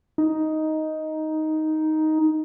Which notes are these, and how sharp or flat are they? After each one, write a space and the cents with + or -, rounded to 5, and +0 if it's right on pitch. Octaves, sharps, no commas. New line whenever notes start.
D#4 +5